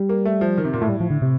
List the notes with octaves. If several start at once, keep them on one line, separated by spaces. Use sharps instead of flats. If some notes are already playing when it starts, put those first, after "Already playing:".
Already playing: G3
A#3
A3
F3
D#3
C3
A#2
A2 A3
G3
F3
D3
C3